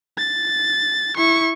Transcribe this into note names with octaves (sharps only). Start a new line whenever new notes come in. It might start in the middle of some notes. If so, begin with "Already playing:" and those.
A6
E4 C#6